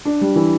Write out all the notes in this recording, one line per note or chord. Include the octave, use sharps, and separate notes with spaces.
D4
G3
E3